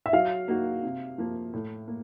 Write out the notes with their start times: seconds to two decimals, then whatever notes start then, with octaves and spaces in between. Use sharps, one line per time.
0.06 E5
0.13 F#3 F5
0.48 A#3 D#4 F#4
0.83 C3
1.18 F3 A#3
1.53 A2
1.88 A#3